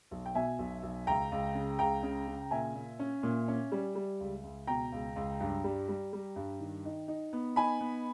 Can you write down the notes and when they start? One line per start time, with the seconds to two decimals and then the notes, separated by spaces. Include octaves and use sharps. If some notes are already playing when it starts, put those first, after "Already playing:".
0.11 B1
0.26 G5
0.35 B2 E5 G#5
0.59 B1
0.83 B1
1.07 C#2 G5 A#5
1.32 C#2
1.55 C#3
1.79 C#2 G5 A#5
2.03 C#3
2.28 C#3
2.51 A#2 E5 G#5
2.75 A#2
2.99 C#4
3.23 A#2
3.48 C#4
3.72 G3
3.95 G3
4.21 C#2
4.43 C#2
4.67 B2 G5 A#5
4.92 C#2
5.16 C#2
5.40 G2
5.64 G3
5.88 G3
6.13 G3
6.36 G2
6.60 D#3
6.85 D#4
7.08 D#4
7.33 B3
7.56 D#4 G#5 B5
7.81 B3